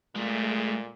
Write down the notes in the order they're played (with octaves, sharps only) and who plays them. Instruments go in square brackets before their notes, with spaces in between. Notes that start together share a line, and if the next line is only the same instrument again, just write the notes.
[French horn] A#2 [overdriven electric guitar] G#3 A3